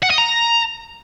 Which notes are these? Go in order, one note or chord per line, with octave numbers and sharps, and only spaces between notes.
F#5
D#5
A#5